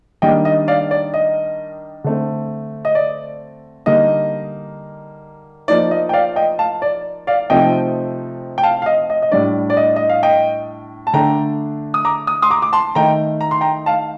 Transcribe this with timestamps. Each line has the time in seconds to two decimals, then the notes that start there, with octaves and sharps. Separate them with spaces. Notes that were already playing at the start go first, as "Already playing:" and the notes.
0.22 D#3 G3 A#3 D4 D#5 G5
0.45 D#5
0.68 D5 F5
0.91 D5
1.14 D#5
2.04 D3 A3 C4
2.85 D#5
2.95 D5
3.86 D3 G3 A#3 D#4 D#5
5.68 F3 A#3 D#4 D5
5.91 D#5
6.09 G5
6.13 D5 F5
6.36 D#5 G5
6.59 F5 A5
6.82 D5
7.27 D5 F5
7.50 C3 F3 A3 C4 D#4 D#5 G5
8.58 G5
8.63 F5 A5
8.82 F5
8.86 D#5
9.10 D#5
9.22 D#5
9.32 A2 G3 D4 D5
9.70 D5
9.77 D#5
9.96 D#5
10.09 F5
10.23 D#5 G5
11.07 A5
11.13 D3 A3 D4 G5 A#5
11.94 D#6
12.05 A#5 D6
12.27 D#6
12.42 C6 D#6
12.51 A#5 D6
12.62 D6
12.73 A5 C6
12.95 D#3 A3 D#4 G5 A#5
13.41 A#5
13.51 C6
13.61 G5 A#5
13.86 F5 A5